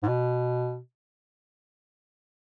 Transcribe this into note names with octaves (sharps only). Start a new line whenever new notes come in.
G#2
B2